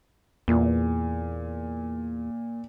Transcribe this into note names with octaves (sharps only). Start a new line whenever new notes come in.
E2 A#2